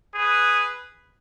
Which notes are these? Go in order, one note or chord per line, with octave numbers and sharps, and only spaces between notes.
G#4 B4